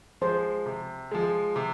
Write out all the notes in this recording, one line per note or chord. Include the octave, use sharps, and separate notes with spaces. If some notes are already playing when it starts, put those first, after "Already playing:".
F3 G#3 C5
C3
F3 G#3
C3